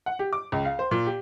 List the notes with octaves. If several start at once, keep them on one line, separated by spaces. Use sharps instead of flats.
F#5
G4
D6
C#2
F5
C5
A#2
G4